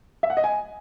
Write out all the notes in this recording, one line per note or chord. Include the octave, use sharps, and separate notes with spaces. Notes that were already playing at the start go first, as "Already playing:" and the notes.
E5
F#5
D#5
G#5